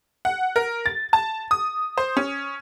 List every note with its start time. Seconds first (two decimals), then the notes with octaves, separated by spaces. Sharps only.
0.25 F#5
0.56 A#4
0.86 A6
1.13 A5
1.51 D#6
1.98 C5
2.17 C#4